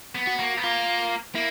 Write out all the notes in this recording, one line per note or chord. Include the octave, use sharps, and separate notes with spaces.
B3
F#4
A#3
B3
A#3 F4
A#3 E4